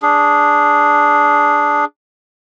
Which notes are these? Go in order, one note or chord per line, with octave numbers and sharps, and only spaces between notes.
D4 G#4